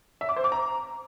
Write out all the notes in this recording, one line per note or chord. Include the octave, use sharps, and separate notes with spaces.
E5
D6
C5
D6
A#5